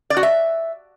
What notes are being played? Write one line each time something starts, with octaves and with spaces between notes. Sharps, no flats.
D5
F#4
E5